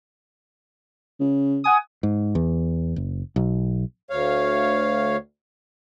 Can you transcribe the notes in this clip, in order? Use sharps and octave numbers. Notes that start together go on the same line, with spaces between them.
C#3
F#5 G#5 D#6
G#2
E2
F#1
B1
D2 C#5 F5